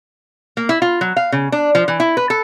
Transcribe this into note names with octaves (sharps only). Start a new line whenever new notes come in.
A#3
E4
F4
F#3
F5
C#3
D4
F3
E3
E4
B4
A4